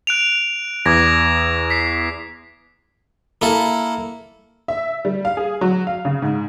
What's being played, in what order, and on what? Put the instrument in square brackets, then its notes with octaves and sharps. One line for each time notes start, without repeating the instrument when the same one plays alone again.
[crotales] F#6 D7 F7
[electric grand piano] E2 [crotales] D6 G#6 A#6
[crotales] B6 C7
[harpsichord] A#3 E4 A4
[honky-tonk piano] E5
G3
F5
G#4
F#3
F5
C#3
G#2